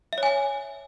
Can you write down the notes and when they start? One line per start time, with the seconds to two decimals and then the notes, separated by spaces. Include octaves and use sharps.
0.13 E5
0.18 C#5
0.23 G#5